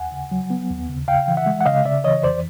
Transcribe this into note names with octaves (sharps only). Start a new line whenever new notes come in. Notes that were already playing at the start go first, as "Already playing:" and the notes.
Already playing: D#2 F#5 G#5
C#3
F#3
B3
D#2
C#3
C#3 F5 G5
E3
E5 F#5
G#3
F#5
C#3 D#5 F5
C#3 D5 E5
E3 C#5 D#5
F2 C5 D5